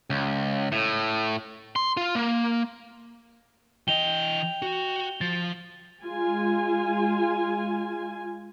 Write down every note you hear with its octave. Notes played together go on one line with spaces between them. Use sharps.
C#2
A2
C6
F4
A#3
E3 D#5 G5 F7 G7
F#4
F3 A6
G#3 F4 G#5